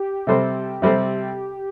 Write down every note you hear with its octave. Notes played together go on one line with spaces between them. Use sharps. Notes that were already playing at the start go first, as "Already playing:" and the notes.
Already playing: G4
C3 G3 C4 A4 C5
C3 G3 C4 A4 C5